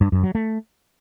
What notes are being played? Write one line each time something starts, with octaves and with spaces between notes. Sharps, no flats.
G2
F#2
F#3
A3